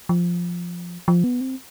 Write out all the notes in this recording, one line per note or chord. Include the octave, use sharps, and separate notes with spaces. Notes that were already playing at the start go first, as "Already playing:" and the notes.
F3
F3
B3
C4